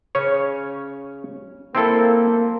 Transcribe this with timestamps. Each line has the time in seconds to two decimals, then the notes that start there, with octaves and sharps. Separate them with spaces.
0.15 C#3 C#4 C#5
1.75 A#3 C4 E4 A4